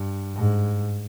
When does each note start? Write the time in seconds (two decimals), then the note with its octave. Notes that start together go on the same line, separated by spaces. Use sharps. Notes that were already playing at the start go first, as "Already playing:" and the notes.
Already playing: G2
0.34 G#2